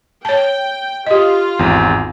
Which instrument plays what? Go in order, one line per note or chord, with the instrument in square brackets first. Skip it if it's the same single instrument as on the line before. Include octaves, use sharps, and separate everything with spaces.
[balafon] C#5 A5 [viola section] G5
[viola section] F4 [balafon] G4 D#5
[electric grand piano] G#1 E2